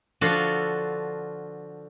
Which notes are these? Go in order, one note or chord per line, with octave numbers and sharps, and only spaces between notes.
D3 F3 F4 F#4 A4